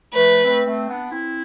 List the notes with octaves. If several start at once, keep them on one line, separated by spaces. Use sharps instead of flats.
F3 A3 B4
A3 C4
A3 C4
B3 D4
C4 E4